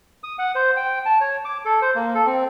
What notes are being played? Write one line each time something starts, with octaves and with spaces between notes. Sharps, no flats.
D#6
F#5
C5
G5
A5
C#5
D6
A4
C5
A#3
A4
C4